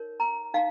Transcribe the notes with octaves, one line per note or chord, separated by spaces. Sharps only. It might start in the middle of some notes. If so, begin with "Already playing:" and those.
Already playing: D#4 A#4 C#5
A#5
D#4 F5